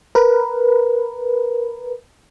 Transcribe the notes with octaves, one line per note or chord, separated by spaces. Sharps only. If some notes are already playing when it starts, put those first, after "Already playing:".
A#4 B4